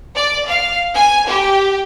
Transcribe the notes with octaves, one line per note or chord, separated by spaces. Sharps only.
D5
F5
G#5
G4